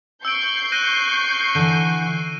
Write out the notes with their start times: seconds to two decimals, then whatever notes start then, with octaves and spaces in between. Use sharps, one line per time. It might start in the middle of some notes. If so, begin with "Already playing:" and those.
0.25 C#6 E6 G6 C7 D7
0.72 F#6 A#6 D#7
1.55 D3 E3 D#7